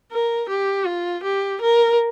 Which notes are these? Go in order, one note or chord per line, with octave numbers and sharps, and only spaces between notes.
A#4
G4
F4
G4
A#4